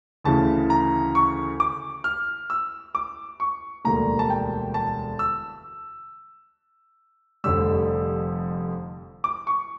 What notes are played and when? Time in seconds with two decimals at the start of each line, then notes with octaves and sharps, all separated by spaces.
0.24 D2 C#3 E3 A5
0.70 A#5
1.15 C#6
1.60 D6
2.04 F6
2.50 E6
2.95 D6
3.40 C#6
3.84 E1 D2 D3 G3 A#3 A#5
4.19 A5
4.30 G5
4.74 A5
5.19 E6
7.44 F1 F2 D3 G3 E6
9.24 D6
9.47 C#6